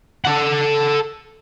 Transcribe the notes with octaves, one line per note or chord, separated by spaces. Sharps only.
A4 F#5